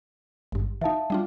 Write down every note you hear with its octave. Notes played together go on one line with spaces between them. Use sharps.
G#1 G2
E3 D#4 E5 F5 A5
G3 D4 F4